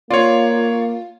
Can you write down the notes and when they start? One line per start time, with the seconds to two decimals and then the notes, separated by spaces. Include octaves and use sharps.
0.10 A#3 F4 C#5 D5